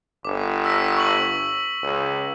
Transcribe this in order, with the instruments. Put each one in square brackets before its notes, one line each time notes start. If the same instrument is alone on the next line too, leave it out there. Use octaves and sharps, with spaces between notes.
[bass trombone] G1 [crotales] D6
[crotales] E6 A#6 B6
C#6 F#7
[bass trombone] C#2